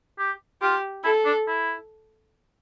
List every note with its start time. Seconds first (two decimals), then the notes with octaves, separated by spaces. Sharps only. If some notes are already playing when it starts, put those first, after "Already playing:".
0.19 G4
0.61 F4 G4
1.04 E4 A4
1.25 D4
1.47 E4